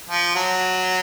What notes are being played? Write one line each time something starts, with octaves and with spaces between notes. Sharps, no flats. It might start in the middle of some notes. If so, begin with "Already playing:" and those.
F3
F#3